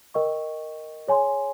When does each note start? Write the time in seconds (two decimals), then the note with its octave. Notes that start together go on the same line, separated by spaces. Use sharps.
0.14 A#4 D#5 G5 C#6
1.08 G#4 C#5 G#5 C6